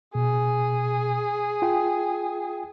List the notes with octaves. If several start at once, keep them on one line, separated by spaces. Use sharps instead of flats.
B2 G#4
F4 G5